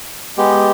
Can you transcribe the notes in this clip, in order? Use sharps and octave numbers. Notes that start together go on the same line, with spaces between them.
G#3 B3 G4